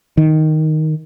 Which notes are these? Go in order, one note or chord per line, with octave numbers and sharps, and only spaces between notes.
D#3